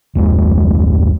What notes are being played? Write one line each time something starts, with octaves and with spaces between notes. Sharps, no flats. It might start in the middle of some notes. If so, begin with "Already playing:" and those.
F#1 D#2 G#3